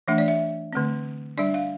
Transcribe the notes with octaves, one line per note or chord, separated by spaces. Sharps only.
E3 A3 D4 E5
D5
E5
D3 A3 C4
G3 D4 D5
F5